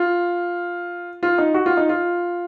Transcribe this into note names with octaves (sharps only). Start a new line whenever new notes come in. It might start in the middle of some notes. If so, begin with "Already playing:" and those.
Already playing: F4
F4
D#4
F#4
F4
D#4
F4